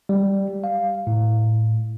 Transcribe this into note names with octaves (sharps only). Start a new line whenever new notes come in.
G3
F5
A2